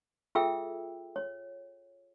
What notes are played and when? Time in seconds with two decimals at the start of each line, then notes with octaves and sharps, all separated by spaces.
0.35 F4 G#4 A4 E5 G5 E6
1.16 C#5